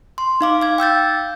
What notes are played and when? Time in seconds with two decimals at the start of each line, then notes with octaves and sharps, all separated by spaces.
0.18 C6
0.41 D#4 F5 D6
0.61 F5 G#6
0.78 G5 E6 G6 A6